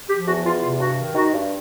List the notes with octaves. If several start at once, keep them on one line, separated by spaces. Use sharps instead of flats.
F3 G4
E2 F#4
E2 F4
C3 F4
G2 F#4
D#3
D#3 F#4
G2